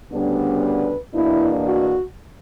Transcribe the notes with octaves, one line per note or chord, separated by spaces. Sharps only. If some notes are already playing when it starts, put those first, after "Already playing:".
D2 C#3 G3 B3 D4
B4
E2 B2 A#3 D4 E4
F#4